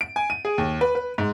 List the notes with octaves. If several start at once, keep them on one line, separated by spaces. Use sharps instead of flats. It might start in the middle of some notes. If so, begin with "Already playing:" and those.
D7
G#5
D#7
G#4
D#2
B4
B4
G#2